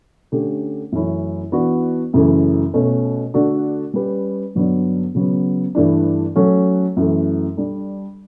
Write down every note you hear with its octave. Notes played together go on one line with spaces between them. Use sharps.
D3 A3 C#4 G4
F#2 E3 A3 C#4 E4
E3 B3 D4 F#4
F#2 C#3 E3 A3
B2 A3 C#4
D3 A3 D4 F#4 A4
G3 C#4 G4 B4
G2 D3 F#3 B3 D4
C#3 F#3 B3
G2 E3 A3 D4
F#3 A3 C#4 F#4 A4
F#2 E3 A3
G3 D4 A4